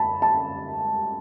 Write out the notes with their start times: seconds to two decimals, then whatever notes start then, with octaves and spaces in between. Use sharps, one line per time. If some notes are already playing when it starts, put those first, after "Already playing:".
Already playing: A5 B5
0.22 A5